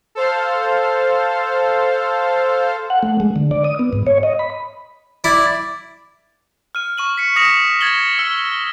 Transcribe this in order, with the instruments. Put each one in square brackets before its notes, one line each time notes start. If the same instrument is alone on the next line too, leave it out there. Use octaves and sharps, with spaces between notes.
[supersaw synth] A4 C5 F5
[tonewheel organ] F#5
A3
G#3
D3
D5
D#6
B3
G#2
C#5
D#5
B5
[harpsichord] E4 [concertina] D5
[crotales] F6 D#7
C#6 D#7 F#7
B6 C#7
D#6 A#6 B6 C#7 E7 F7
G#6 A6 F#7 G7
E6 C#7